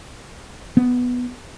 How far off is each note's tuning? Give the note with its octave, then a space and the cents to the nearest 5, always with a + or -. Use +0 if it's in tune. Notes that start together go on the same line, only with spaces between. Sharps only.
B3 +0